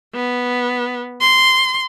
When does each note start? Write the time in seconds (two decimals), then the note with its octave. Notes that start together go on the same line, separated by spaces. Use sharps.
0.15 B3
1.21 C6